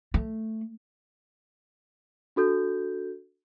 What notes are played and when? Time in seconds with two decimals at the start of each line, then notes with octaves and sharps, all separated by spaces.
0.14 A3
2.36 D4 F#4 A4 G6